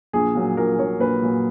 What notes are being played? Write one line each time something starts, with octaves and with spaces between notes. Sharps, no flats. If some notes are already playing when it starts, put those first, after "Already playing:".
A#1 G#4
A#2 F#3
A#1 A#4
A#2 F#3 C#5
A#1 B4
A#2 F#3